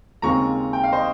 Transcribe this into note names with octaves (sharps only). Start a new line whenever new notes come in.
D#2 C#3 G#3 C4 F4 A#5 C#6
G5
F5
C5 D#5